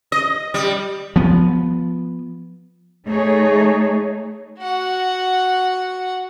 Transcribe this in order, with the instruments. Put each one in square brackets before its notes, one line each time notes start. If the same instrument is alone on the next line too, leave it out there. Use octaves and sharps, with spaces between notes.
[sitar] D#5
G3
[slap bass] F3 B3
[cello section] A3 D#4 G#4 C#5
[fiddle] F#4 F#5